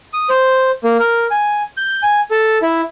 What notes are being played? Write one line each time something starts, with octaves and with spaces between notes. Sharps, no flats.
D#6
C5
A#3
A#4
G#5
G6
G#5
A4
E4